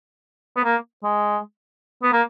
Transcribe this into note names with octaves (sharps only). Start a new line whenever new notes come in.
B3
A#3
G#3
B3
A#3